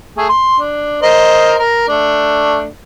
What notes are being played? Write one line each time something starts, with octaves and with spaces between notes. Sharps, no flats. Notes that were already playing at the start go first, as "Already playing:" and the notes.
A3 G#4
C6
D4
A#4 C5 D#5
A#4
A3 D4